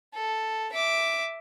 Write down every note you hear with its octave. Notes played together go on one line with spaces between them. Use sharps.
A4
E5 D6